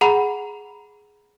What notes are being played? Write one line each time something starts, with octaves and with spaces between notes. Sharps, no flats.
G#4 F#5 A#5 B5 F7